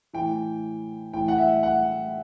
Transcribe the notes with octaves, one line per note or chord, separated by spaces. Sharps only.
A2 E3 G5
A2 E3 G5
F#5
E5
F#5